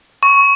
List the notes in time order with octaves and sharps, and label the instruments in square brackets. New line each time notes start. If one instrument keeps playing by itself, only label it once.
[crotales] C#6